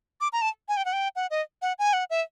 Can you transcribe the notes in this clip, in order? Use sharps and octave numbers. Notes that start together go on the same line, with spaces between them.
D6
A#5
A5
G#5
G5
F#5
G5
F#5
D#5
F#5
G#5
F#5
E5